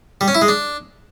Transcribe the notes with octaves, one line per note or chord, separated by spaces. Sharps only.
G3
C#4
E4
G#3
D4